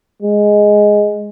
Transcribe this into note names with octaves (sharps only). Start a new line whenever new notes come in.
G#3